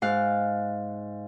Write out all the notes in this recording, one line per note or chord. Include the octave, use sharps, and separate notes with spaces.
G#2 F5 F#6